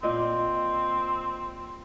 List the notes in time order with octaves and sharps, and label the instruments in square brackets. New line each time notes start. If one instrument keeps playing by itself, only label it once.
[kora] A#2 D#5 [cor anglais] C4